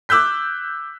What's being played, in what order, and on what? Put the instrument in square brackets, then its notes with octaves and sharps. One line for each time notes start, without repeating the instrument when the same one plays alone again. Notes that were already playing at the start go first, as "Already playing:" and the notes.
[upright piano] D6 E6 F#6 G6 B6